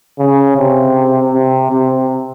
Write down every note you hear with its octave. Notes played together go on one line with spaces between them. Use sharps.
C#3
C3
C3
C3